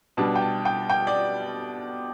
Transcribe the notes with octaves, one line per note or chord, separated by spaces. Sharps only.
B2 G3 D4 A5
G5
A5
G5
G5
D5